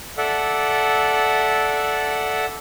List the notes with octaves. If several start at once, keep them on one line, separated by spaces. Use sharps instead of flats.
A4 D5 E5 F#5